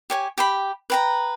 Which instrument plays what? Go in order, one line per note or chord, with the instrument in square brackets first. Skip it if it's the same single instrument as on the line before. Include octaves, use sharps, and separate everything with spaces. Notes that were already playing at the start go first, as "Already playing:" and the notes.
[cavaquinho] G4 C#5 G#5
G4 G5 B5
B4 G5 A#5